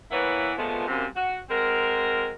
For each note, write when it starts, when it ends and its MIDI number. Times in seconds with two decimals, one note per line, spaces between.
0.11 0.53 52
0.11 0.53 58
0.11 0.53 59
0.11 0.53 64
0.11 0.53 71
0.11 0.53 73
0.58 0.86 46
0.58 0.86 53
0.58 0.86 56
0.58 0.86 57
0.58 0.86 59
0.88 1.05 42
0.88 1.05 48
0.88 1.05 58
0.88 1.05 60
1.16 1.38 66
1.50 2.32 56
1.50 2.32 60
1.50 2.32 66
1.50 2.32 70